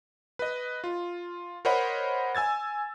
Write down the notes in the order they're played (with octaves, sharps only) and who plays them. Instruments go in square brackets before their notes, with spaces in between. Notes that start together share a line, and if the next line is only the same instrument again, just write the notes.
[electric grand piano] B4 D#5
F4
A#4 C5 C#5 D#5 F#5 B5
G#5 E6 G#6 A6